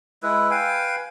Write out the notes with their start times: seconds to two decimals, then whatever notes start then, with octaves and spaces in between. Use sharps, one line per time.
0.23 G#3 E4 B4
0.51 B4 F5 G5 G#5